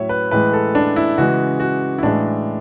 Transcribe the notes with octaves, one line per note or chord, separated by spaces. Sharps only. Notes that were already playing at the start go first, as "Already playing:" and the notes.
Already playing: A2 F#3 C#5 E5
B4
A2 E3 G#3 B4
A4
D4
E4
C#3 E3 G#3 F#4
F#4
E4
A2 E3 G#3 D4